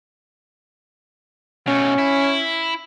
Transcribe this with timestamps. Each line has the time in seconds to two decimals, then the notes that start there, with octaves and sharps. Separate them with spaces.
1.67 B2 A3 C#4
1.99 E4